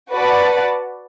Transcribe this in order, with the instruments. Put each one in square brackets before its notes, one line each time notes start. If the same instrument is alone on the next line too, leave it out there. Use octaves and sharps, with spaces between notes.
[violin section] F#4 B4 D5 F#5 A5